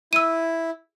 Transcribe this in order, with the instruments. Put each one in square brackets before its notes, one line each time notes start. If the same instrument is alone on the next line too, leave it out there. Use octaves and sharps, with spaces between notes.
[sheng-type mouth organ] E4 [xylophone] E6 D#7